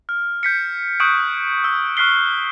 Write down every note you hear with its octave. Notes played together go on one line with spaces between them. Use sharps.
F6
G6 B6 C#7
C#6 D#6 F#6 G6 D7
E6
C#6 F6 F#6 B6 C7 G7